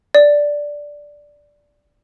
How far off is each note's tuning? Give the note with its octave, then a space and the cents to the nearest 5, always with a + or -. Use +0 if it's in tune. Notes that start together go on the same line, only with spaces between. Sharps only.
D5 -5